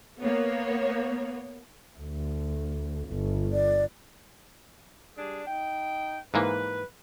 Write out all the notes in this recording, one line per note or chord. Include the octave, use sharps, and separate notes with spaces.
A#3 B3 C#5
D2
G1
D5
G3 D4 G#4
D#4 G5
G#2 E3 A#3 B4